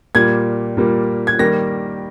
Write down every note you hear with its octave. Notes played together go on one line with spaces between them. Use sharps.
A#2 G3 A#3 G#6
A#2 G3 A#3
G#6
D#3 G3 A#3 A#6